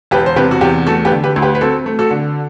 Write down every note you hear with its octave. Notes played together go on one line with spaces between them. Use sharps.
E1 G4 B4
C5
C3 G4 B4
F#4
E2 G4
A3 F#4 A4
G4 B4
D3
G4 B4
D2
G4 B4
B4
C4 F#4 A4
A3
F#4 A4
D3